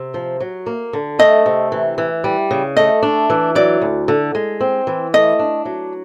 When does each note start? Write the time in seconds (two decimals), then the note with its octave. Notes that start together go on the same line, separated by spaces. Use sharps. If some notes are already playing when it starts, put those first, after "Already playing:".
Already playing: C3
0.14 F3
0.40 F#3
0.66 A#3
0.93 D3
1.19 A3 D#5
1.46 C3
1.72 E3
1.98 E3
2.24 G3
2.51 C#3
2.77 A3 D#5
3.03 D4
3.30 E3
3.55 F#3 D5
3.81 D2
4.08 D3
4.35 G#3
4.61 C4
4.87 E3
5.14 A3 D#5
5.39 D4
5.65 F#3